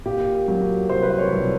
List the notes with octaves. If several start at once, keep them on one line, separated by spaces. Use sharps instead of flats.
A#2 G4
F#3
C2 C5
B4
C5
C#5
C2